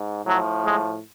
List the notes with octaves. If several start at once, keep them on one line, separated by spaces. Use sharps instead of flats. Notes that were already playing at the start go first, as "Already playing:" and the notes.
Already playing: G#2
A2 F3 F#3
G#3